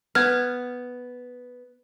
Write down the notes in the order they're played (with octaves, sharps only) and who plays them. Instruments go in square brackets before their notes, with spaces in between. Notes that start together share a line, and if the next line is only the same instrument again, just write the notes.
[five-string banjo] B3 [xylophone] F6 G#6